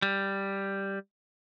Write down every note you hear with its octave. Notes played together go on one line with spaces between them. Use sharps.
G3